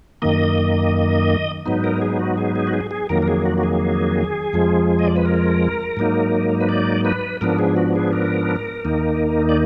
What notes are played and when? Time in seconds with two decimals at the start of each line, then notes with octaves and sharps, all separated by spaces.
0.22 F#2 D#3 A#3 D#5
1.66 G#2 F#3 B3 D#4
1.84 A#4
2.02 G#4
2.19 F#4
2.38 G#4
2.56 G#4
2.67 F#4
2.73 G#4
2.91 G#4
3.09 F2 D#3 F#3 A#3 A#4
3.22 A#4
3.28 G#4
3.45 F#4
3.58 F#4
3.63 G#4
4.53 F2 F3 G#3
4.99 D#5
5.07 D5
5.16 B4
5.26 A#4
5.97 G#2 F#3 A#3 D#4
6.61 B4
6.69 D5
7.05 B4
7.41 G#2 F3 B3 D4 A#4
7.59 G#4
7.76 F#4
7.95 G#4
8.13 A#4
8.85 D#2 D#3 A#3 D#4
9.49 D5